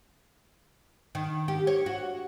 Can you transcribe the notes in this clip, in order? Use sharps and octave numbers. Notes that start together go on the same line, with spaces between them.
D#3
G4
C#5
F#4